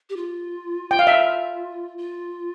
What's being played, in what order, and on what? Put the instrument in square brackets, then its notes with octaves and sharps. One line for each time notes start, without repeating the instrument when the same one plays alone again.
[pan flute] G4
F4
[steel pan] G5
F5
[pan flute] F4 [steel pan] E5
[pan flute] F4